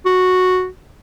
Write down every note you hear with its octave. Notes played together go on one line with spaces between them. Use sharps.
F#4